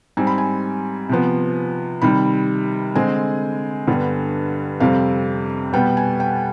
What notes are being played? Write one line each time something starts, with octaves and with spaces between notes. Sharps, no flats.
G#2 G3 C4 G#5
B5
G#5
C3 F3 B3
C3 D#3 G3 B5
D3 G#3 C4 G#5
G2 D3 G3 B3
F2 C3 G3 C4 F5
B2 G3 B3 G5
G#5
G5